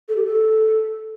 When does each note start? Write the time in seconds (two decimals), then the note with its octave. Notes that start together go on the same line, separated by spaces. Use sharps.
0.09 A4
0.16 G4
0.24 A4